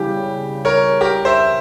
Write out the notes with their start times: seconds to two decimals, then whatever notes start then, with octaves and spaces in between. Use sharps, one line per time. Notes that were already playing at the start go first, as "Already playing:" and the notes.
Already playing: C#3 E3 G3 G4
0.65 A#4 C#5
1.01 G4 A#4
1.25 C5 E5